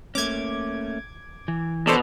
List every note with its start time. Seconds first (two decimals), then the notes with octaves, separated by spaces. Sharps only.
0.15 A3 A#3 C#4 D6 G#6
1.48 E3
1.87 B2 D4 A4 C5